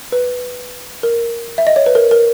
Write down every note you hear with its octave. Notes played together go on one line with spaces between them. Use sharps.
B4
A#4
E5
D#5
C#5
B4
A#4
A#4